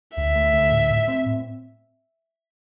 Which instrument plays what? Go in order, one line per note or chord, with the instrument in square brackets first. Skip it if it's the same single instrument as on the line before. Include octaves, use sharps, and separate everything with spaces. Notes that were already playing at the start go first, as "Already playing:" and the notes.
[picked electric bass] D2 [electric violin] E5
[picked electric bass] A3
D2
A2
A2
C4
A2